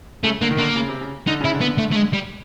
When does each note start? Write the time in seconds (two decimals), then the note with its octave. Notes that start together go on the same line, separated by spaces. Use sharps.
0.24 C#3 A3
0.42 D3 A#3
0.51 D#3
0.59 D3 A#3
0.76 C#3
0.88 C3
1.01 C#3
1.27 D3 D#4
1.41 C#3 E4
1.54 D3
1.61 B3
1.78 A3
1.92 A3
1.96 G#3
2.13 G3